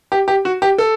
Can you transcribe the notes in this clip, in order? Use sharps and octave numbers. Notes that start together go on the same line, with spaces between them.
G4
G4
F#4
G4
A4